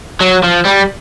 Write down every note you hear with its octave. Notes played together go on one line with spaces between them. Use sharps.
F#3
F3
G3